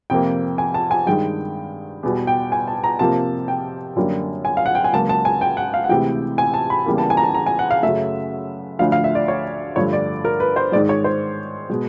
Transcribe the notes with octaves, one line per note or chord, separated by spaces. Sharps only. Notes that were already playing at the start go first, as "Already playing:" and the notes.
F2 C3 F3 A#3 G5
G#5
A5
G#5
G2 D#3 G#3 G5
E2 B2 G3
G5
G#5
A5
A#5
F2 C3 F3 A#3 A5
G5
F#2 D3 G3 A#3
G#5
F5
F#5
G5
G#5
C#2 C#3 F#3 A#3 A5
A5
G#5
G5
F#5
F5
F#5
D2 C3 E3 G#3 G5
G#5
A5
B5
E2 C#3 E3 G3 A#3
A5
G#5
A#5
A5
A#5
G#5
F#5
F5
F#2 C#3 F#3 A3 E5
D2 D3 F3 F5
F5
E5
D5
C#5
G2 D3 F3 A3 C#5
D5
A#4
B4
C5
G#2 D#3 G#3 D5
C#5
C5
B2 G#3